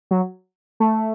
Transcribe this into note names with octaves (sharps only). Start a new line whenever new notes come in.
F#3
A3